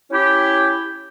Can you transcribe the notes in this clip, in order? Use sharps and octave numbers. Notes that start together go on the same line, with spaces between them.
C#4 E4 G4